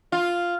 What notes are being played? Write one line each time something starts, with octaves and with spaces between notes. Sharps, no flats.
F4